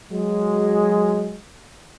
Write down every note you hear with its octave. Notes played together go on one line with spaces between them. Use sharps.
F#3 G#3